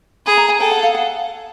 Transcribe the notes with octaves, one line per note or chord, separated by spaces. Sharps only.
G#4 B5
A#5
G#5
A4 G5
F#5
F5
F#5